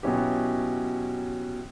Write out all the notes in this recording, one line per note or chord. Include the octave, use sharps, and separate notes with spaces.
B2 F#3 C#4 E4 G4